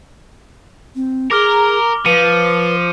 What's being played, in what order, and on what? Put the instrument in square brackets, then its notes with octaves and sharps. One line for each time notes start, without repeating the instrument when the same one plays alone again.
[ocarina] C4
[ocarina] G#4 [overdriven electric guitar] A#4 [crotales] D6 F6 G7
[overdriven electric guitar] F3 [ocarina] B4 [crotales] C#7 D#7